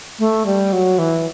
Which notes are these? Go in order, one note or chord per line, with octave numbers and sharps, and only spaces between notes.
A3
G3
F#3
E3